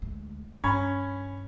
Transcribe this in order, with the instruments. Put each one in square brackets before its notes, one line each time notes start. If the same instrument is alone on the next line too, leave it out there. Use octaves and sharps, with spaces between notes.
[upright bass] D2 G#3
[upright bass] G2 [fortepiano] C#4 [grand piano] B5 C#6 G#6